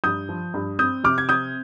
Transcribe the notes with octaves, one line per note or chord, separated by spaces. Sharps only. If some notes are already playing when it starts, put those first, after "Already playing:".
G2 D#6 G6
F3
G2
C4 D#6 G6
C3 D6 F6
G#6
C4 D#6 G6